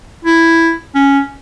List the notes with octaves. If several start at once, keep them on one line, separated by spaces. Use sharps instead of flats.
E4
C#4